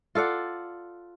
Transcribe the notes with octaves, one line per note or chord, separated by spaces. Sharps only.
F4 A4 D5 F#5